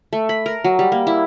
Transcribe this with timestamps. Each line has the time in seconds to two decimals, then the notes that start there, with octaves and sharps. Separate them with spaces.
0.13 A3
0.29 B5
0.46 A#4
0.64 F#3
0.79 G3
0.92 A#3
1.07 E4